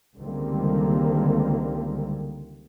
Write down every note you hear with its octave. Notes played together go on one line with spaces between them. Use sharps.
C#2 D3 D#3 G3 A#3 C4